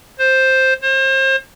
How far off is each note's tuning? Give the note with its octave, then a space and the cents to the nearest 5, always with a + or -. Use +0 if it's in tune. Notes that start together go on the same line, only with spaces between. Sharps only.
C5 +5
C5 +35